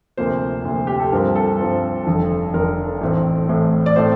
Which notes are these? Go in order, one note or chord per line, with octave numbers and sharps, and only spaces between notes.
D2 C3 F3 A#3 C5
D2 C3 F3 A#3
G4
A4
G2 F3 C4 A#4
A4
G2 F3 C4
F1 F2 D3
F1 F2 D3 A#4
A1 A2 A3 C4
A1 A2 A3 C4
D5
A2 A3 C4 C5